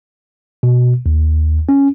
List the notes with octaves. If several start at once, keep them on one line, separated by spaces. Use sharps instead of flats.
B2
D#2
C#4